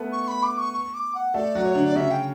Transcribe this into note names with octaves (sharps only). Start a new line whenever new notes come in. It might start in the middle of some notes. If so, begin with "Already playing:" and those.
Already playing: A3 B3 A4 B4
C#6
B5
D6
C#6
C#6
D6
F#5
A3 A4 D5
F#3 F#4
C#5
D3 D4
D5
C#3 C#4 E5
G5